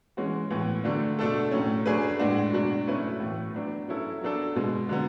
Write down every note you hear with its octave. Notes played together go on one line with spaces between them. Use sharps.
E3 G#3 C#4 F#4
A2 E3 B3
D3 F#3 A3 D4
B2 A3 D4 A4
A2 F#3 A3 C#4
F#3 A3 D4 G#4 B4
A2 G#3 D4 F#4
B2 F#3 B3 D4 F#4
F#3 A3 C#4 E4 B4
A2 E3 A3
F#3 B3 D4
F#3 C#4 E4 A4
F#3 B3 D4 A4
B2 G#3 B3
D3 F#3 B3